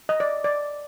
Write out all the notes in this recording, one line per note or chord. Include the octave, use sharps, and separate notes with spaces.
D#5
D5
D5